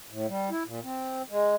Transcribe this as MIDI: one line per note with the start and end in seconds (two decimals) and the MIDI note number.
0.10 0.27 45
0.28 0.50 55
0.50 0.63 64
0.66 0.80 46
0.84 1.22 60
1.30 1.56 56